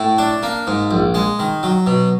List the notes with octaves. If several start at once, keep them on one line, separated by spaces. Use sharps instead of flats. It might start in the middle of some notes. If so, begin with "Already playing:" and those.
Already playing: A2
D4
A#3
G#2
A#1
G#3
D#3
F#3
B2